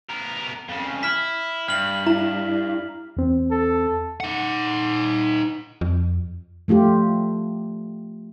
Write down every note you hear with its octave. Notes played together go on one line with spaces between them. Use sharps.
B3 A#4
F2 C#3
E4 F6 B6
G2 F6 F#7
E4 A#5
E2 C4
A4
D#4 F#5
F2
F3 A3 F4 G4